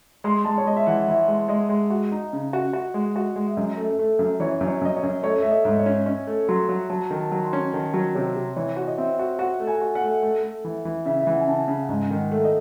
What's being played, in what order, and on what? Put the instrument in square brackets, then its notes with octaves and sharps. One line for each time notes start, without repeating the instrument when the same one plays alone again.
[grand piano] G#3 [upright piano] C6
[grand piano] G#3 [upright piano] A5
[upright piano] C#5
[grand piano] G#3 [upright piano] D#5
[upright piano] E5
[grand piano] E3 [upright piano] F#5
[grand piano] E3 [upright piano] E5
[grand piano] G#3
[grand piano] G#3 [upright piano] D#5
[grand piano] G#3
F#4
D#4
C#3
F#4
F#4
G#3
F#4
G#3
[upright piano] E5
[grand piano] F#2 [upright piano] D#5
[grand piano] A3
A3
F#2
[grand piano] E3 [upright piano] C#5
[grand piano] F#2
[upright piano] C#5
[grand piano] F#2 [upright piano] D#5
[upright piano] C#5
[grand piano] F#2
[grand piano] A3 [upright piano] C#5
[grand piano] A3 [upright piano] E5
[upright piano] D#5
[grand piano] G#2
[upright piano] C#5
[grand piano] C#4
[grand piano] C#4 [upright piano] D#5
[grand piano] A3
[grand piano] F#3 [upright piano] C6
[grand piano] F#3
[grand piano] F#3 [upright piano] A5
[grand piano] D#3
[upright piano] A5
[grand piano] F#3
[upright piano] C6
[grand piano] C#4
[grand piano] D#3 [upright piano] A5
[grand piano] F#3
[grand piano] C3 [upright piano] C#5
[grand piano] C3
[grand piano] E3 [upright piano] C#5
[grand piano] F#4
[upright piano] D#5
[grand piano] C4 [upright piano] E5
[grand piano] F#4
[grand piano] F#4 [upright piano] F#5
[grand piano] A3
[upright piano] G#5
[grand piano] F#4
[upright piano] F#5
[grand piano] A3
A3
A3
E3
E3
[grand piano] C#3 [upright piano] E5
[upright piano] E5
[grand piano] E3 [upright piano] F#5
[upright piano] G#5
[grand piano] C#3 [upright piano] A5
[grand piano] C#3
[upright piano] F#5
[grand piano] G#2 [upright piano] G#5
[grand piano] D#3
[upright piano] F#5
[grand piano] A3
[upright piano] D#5